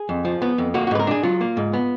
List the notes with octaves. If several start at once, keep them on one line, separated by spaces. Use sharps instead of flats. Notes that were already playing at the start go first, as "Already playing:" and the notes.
Already playing: G#4
F2
F3
B3
F2
A#3 F#4
F#4
G#2 B4
A#4
D4 G#4
F#3 F4
A#3
G#2
B3